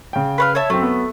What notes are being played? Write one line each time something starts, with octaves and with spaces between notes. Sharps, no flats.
C#3 G5
B4 C#5 F5
C#5 E5 A5
F#2 A3 C4
F#3 B3